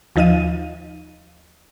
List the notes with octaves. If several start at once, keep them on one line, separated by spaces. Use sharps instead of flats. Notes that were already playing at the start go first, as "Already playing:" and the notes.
D#2 F3 D#4 D#5 F5 D#7